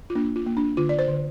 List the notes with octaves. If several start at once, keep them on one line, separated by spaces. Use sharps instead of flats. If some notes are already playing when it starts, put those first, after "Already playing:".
F4
A#3 D4
F4
A#3
D4
D3 F4
D5
C5
D3